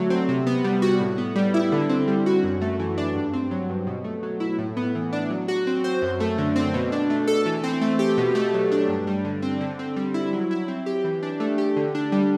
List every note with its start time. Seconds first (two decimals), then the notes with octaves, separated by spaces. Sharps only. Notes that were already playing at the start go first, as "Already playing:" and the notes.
Already playing: D3 F#3 A3
0.10 C4
0.29 C3
0.47 B3
0.64 G3
0.82 F#4
1.00 A2
1.18 B3
1.36 G3
1.54 E4
1.72 D3
1.89 C4
2.08 G3
2.26 F#4
2.44 F#2
2.61 A3
2.79 E3
2.98 D4
3.15 G2
3.33 C4
3.51 F#3
3.70 G2
3.87 B2
4.04 A3
4.23 F#3
4.40 E4
4.58 A2
4.77 B3
4.95 E3
5.13 D4
5.30 F#3
5.48 F#4
5.67 C4
5.84 C5
6.02 F#2
6.20 A3
6.38 D3
6.56 C4
6.74 B2
6.92 D4
7.10 A3
7.27 A4
7.46 E3
7.64 C4
7.81 A3
7.99 G4
8.17 B2
8.35 A3
8.54 F#3
8.71 D4
8.89 G2
9.07 G3
9.25 D3
9.42 C4
9.61 D3
9.79 C4
9.96 G3
10.14 E4
10.33 F#3
10.51 E4
10.68 C4
10.86 G4
11.04 E3
11.23 D4
11.40 A3
11.58 G4
11.76 D3
11.95 D4
12.12 G3